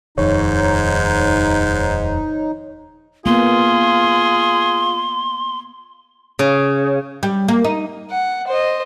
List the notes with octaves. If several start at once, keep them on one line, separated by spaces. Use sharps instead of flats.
D#1 F2 G#2 D#3 D#4 C#5
A#3 B3 F4 G#4 C6
C#3
G3
A#3
D#4
F#5
C5 D#5